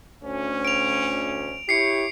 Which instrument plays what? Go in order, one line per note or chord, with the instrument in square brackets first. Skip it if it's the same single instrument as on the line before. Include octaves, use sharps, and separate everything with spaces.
[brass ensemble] D2 C#4
[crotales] D7 F7
[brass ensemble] E4 G4 C#5 [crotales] C7 C#7